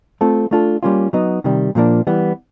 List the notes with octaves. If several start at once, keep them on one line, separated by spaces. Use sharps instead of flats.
A3 C4 F4 A4
A3 D4 F4 A4
G3 A#3 C#4 F4
F#3 B3 D#4
C3 D#3 G3
A#2 F3 A#3 D4
E3 G3 B3